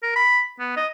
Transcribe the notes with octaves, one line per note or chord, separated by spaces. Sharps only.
A#4
B5
B3
D#5